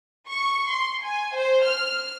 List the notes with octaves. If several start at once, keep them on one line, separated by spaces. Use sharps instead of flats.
C#6
C6
G#5
C5
F6